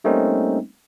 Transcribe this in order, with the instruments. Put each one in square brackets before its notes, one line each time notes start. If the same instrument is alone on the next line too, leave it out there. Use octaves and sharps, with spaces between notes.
[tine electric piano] G3 A3 A#3 C4 C#4 D#4